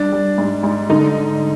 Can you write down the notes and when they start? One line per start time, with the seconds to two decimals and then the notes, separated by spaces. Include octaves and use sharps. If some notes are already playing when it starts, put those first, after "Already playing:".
Already playing: G3 D4
0.12 G3
0.38 G#2
0.63 G#2
0.89 D3 D#4